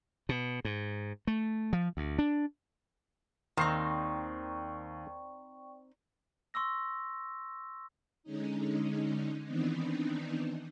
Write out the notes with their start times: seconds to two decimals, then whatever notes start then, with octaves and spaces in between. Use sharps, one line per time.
0.29 B2
0.65 G#2
1.27 A3
1.73 F3
1.97 D2
2.19 D4
3.57 D#2 D#3 C4 D#4 D5 G5 C#6 C7
6.54 C6 C#6 E6 A#6
8.23 D3 G#3 C#4 D#4
9.44 D#3 E3 B3 C4 D4 D#4